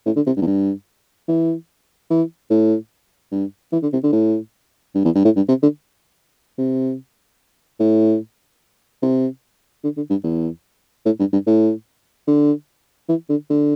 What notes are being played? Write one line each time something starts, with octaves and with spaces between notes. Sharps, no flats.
A2
D3
C3
G2
E2
G2
E3
E3
A2
G2
E3
D3
C3
D3
A2
G2
E2
G2
A2
G2
C3
D3
C3
A2
C3
D3
D3
G2
E2
A2
G2
G2
A2
D3
E3
D3
D3